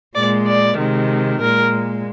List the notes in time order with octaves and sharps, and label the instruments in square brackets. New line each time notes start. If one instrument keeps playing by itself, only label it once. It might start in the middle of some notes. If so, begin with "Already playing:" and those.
[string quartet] A#2 G#3 D5
D5
C3 D#3 G#3
A#2 G#3 A#4